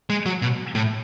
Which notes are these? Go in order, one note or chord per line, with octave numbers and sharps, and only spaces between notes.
G#3
F#3
B2
A2